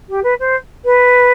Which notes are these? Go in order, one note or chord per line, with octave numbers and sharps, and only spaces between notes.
G4
B4
C5
B4